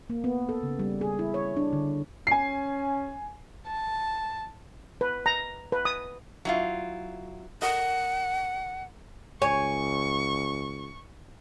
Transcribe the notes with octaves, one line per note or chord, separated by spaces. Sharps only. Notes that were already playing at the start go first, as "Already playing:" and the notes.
A#3
B3
A4
C#3
G3
G#4
E4
C#5
D4
D3
C#4 G#5 C7
A5
B4
A#5
B4
D#6
F#3 E4 F4
A#4 D#5 F#5
C#2 C#5 G#5 C#6